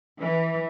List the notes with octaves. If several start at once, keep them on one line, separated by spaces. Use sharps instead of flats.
E3